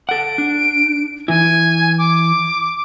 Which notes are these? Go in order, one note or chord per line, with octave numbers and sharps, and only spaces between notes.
A4 F#5 D7
D4
E3 E4 G#5
D6